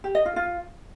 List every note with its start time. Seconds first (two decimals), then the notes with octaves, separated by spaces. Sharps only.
0.04 G4
0.15 D#5
0.26 F4
0.36 F4